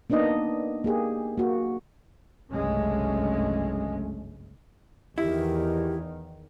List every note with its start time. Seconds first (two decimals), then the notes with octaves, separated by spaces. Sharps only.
0.10 A#3 B3 D4 D#4 D#5
0.84 A#3 G4 G#4
1.38 A#3 F#4
2.51 F#1 C2 G2 G#3 A3 C#4
5.18 E2 D#3 E4 G4